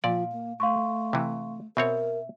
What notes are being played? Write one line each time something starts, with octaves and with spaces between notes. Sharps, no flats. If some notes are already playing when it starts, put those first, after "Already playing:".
A#2 F3 D5 F5
A#3
A3 F5 C6 C#6
C3 E3
B2 C4 A#4 C#5 E5